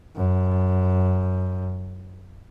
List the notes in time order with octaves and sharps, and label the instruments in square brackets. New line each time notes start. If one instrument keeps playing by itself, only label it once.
[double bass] F#2